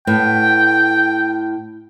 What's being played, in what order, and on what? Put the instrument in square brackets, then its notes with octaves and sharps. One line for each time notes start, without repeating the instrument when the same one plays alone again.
[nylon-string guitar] A2 B3 [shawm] G5